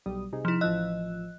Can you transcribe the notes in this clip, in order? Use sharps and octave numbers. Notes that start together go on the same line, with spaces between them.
B1 G3 D#6
C3 D#4 G#4
F3 E4
A1 F3 D#5 E6 F#6